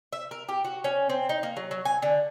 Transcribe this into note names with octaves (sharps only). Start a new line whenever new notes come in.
E5
A#4
G4
F#4
C#4
C4
D#4
A#3
F#3
F#3
G#5
D3